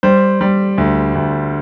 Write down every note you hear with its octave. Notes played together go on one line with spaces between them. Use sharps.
G3 C5
G3
D2
D2